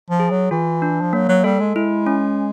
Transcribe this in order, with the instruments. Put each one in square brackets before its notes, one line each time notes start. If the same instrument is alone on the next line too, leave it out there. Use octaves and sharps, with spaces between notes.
[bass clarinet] F3
[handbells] G#4
[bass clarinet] F#3
[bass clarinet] E3 [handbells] F4
[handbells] D4
[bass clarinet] F3
[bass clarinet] F#3 [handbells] A#3
[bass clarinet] F#3
[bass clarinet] G3 [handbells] A4
[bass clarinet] G#3
[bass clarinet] G#3 [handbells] E4
[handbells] C#4